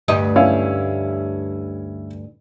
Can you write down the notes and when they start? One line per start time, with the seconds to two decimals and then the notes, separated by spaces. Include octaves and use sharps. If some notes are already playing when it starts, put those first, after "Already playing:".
0.08 D2 G2 D#5
0.36 C#4 E4 F5